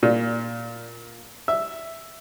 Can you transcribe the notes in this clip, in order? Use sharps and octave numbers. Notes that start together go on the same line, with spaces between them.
A#2
E5